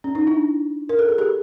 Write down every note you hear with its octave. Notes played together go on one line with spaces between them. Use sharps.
C#4
C#4 D#4
D4 E4
A#4
A4
G#4
G4 A4